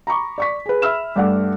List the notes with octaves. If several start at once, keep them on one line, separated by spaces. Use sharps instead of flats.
A#5 B5 C#6 D6
D5 C#6 B6
G#4 B4
E5 B5 E6 F6 E7
G2 A3 D5 F#5